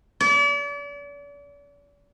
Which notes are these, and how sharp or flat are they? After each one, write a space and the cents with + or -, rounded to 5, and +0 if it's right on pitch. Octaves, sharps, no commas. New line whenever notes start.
D5 -40